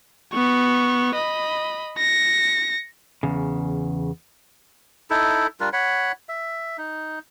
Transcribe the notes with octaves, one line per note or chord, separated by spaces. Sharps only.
B3 C#6
D#5 B5
A#6 C#7
E2 C#3
D#4 E4 A4
G3 D4 F4 A#4
C#5 F#5 B5
E5
D#4